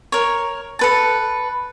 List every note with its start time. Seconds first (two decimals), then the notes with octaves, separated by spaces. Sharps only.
0.12 A#4 C#5
0.79 A4 B4 A5